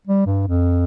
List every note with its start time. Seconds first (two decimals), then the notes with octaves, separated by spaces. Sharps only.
0.07 G3
0.26 G2
0.47 F2